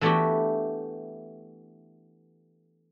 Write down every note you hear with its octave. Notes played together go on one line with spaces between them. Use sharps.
E3 A3 B3 D4 F#4 G4